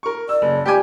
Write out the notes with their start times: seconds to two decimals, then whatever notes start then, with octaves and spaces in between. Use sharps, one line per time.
0.03 A#4 C#6
0.29 D5 E6
0.42 F#1
0.66 G3 G4 G5 G#5 D6